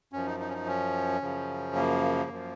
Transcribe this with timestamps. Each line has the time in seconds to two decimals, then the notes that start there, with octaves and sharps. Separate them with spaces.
0.13 F#2 F3 C#4
0.27 D#4
0.40 D#4
0.49 C#4
0.53 D#4
0.67 C#4
1.21 F#2 C#3 F3
1.75 A#3
2.29 F#2 F3